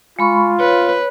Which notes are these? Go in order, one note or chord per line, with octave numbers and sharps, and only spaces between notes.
G#3 F4 B5 C#6
B4 C#5